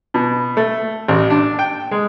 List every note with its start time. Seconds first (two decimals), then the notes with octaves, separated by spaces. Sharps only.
0.14 B2
0.57 A3
1.08 A1
1.30 D4
1.59 G5
1.91 G#3